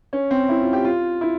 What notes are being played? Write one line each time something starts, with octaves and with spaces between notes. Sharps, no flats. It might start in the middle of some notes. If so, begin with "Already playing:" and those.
C#4
C4
E4
F4
G4
F4
E4